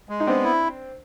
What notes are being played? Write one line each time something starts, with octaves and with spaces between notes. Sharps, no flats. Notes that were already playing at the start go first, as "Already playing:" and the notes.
G#3
D#4
B3 C4 D4
E4